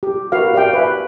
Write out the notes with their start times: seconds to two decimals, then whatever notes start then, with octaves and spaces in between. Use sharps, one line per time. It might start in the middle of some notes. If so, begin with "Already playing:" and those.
0.03 G4
0.32 F#4 A#4 B4 F5
0.54 G4 D5 E5 F5 G5
0.73 B4 E5 G#5